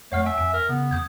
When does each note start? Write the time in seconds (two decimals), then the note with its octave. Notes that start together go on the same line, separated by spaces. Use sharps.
0.12 F2 A3 C#5 F#5 F6
0.26 E5 G#5
0.38 F2 G#5
0.53 A#4
0.69 C#3 B3
0.91 F2 D#6 G6 G#6